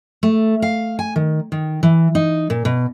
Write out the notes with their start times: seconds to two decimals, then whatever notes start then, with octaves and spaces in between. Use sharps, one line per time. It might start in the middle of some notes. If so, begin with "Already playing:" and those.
0.23 A3
0.62 F5
0.99 G#5
1.16 D#3
1.52 D#3
1.83 E3
2.15 D#4
2.50 A#2
2.65 B2